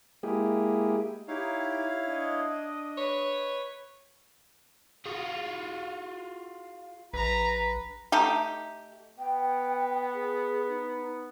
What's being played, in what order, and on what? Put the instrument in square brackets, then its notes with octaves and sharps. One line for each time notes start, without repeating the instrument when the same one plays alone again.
[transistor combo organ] G#3 A#3 E4 G4 G#4
[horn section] D#4 G4 [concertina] E4 C#5 F5
[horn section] D4 D#5
[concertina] B4 [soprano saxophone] C#5
[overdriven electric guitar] F4 F#4 [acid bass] G#4
[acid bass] A#1 [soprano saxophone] B4 [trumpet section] A#5
[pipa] A3 D#4 G4
[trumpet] B3 [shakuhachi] G5
[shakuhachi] G#4
D#4